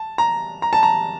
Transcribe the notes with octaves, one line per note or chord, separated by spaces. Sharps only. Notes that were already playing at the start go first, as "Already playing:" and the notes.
Already playing: A5
A#5
A#5
A5
A#5